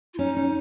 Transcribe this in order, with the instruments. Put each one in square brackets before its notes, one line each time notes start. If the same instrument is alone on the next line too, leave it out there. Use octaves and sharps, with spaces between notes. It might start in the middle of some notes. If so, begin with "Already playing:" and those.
[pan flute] F4
[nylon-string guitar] C#4 [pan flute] D#4
[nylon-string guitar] C#4